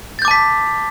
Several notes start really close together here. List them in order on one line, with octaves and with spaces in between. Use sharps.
A6 G6 D6 A5 B6